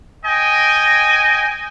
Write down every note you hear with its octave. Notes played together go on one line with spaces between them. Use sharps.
D#5 G5 G#5